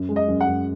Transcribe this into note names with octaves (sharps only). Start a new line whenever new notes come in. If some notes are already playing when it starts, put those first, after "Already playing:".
Already playing: F#2
G#3
D#5
F#2
F#5
F#2